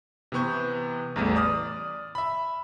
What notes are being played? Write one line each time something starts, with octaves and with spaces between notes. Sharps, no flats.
C3 E3 B3 C#6 G6
A1 E2 G3 A3
D5 D#6 F6
E5 B5